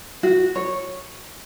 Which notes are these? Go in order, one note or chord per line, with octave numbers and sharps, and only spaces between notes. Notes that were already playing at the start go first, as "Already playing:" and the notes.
F#4
C#5